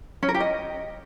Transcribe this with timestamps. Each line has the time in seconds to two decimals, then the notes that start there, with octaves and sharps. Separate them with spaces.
0.23 C#4
0.29 A#4
0.34 G4
0.40 D#5